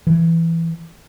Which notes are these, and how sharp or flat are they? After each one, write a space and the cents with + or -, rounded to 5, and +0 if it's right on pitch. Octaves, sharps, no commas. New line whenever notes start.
E3 +10